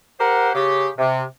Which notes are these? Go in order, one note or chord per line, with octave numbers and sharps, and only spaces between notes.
G4 A#4 C5 F#5
C#3 G4
C3